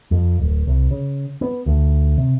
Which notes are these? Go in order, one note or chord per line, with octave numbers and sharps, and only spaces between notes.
F2
D1
C2
C#3
B3
D2
C3